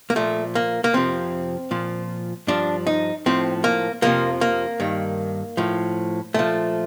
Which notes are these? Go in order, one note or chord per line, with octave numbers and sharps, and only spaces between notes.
A#3
A#2 F3 A3
A#3
A#3
F2 C3 F3 C4
A#2 F3
G2 F3 D4
D#4
A2 F3 C4
A#3
F2 C3 F3 A#3
A#3
G2 D#3
A2 F3
A#2 F3 A3